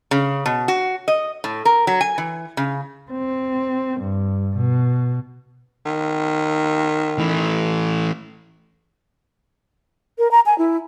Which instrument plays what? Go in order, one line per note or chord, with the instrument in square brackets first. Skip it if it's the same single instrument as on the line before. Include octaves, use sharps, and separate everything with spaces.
[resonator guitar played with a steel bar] C#3
B2
F#4
D#5
A2
A#4
F#3
G#5
E3
C#3
[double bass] C4
G2
B2
[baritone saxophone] D#3
[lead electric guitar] E3 A3
[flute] A#4
A#5
G#5
E4